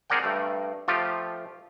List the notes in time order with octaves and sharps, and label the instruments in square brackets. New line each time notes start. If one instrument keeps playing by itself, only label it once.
[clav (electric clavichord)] C4 G#4 A#4 D5 F#5 G5
G2 A3
F3 A3 F4 G4